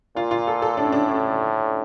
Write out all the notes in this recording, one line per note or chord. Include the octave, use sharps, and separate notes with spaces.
A#2 F4
F4
A4
A4
A2 D4
C#4
D4
C#4